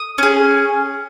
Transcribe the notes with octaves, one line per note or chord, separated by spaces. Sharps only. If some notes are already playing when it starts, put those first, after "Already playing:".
Already playing: D#6
C#4 G#4